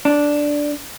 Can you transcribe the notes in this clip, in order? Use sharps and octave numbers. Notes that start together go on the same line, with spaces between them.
D4